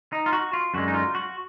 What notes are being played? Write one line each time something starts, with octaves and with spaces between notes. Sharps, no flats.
D#4
F4
F#4
F4
F#2 D3 G#3 F#4
D#4
F4
F#4